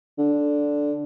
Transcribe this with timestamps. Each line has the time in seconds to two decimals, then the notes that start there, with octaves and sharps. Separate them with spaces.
0.19 D3